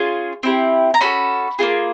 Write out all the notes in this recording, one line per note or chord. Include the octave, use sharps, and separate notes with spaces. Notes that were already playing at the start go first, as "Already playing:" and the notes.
Already playing: C#4 F4 G#4
C4 E4 G4
A#5
C#4 F#4 A4 B5
A#3 D4 F4 G#4